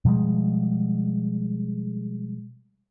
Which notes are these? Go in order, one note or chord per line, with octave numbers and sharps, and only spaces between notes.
B2 F3 G3 G#3